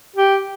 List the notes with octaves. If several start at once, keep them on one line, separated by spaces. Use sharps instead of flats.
G4